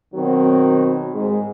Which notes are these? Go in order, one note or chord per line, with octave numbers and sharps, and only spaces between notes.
B2 D#3 F#3 C4
G#2 G#3